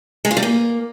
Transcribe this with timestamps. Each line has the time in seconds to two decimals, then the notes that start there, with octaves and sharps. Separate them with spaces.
0.25 G#3
0.31 F4
0.37 G3
0.43 A#3